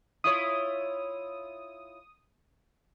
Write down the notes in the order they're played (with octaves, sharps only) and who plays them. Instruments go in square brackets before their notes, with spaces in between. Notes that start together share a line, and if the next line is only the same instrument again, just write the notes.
[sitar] E4 F4 C#5 [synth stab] D#6